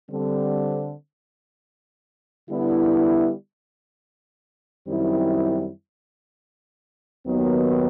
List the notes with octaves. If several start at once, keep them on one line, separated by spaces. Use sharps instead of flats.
D3 G3 C4
D3 G3 B3 E4
F#2 D#3 G3 C4 E4
D#2 D#3 F#3 B3